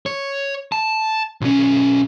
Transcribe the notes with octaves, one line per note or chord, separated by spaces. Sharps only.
C#5
A5
B1 C#4